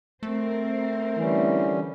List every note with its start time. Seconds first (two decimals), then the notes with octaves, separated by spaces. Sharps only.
0.23 A3 C4 A#4 C5
1.17 D3 E3 G3 C#4